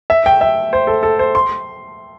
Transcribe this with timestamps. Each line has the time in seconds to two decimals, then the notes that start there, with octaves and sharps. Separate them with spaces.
0.10 E5
0.26 G5
0.41 E5
0.73 C5
0.87 A4
1.03 A4
1.19 C5
1.35 C6